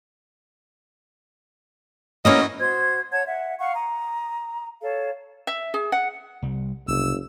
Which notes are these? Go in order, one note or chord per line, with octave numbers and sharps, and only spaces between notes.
E3 F#3 A#3 C#4 C#5 D#5
F#4 C5 G#6
C#5 F#5 A5 G#6
E5 F#5
F5 F#5 C#6
A#5 D#6
A4 C#5 F5
E5
G#4
F#5
C2 G3
F#1 C2 E6